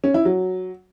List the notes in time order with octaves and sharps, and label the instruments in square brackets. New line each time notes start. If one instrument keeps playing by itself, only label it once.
[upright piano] C#4
E4
F#3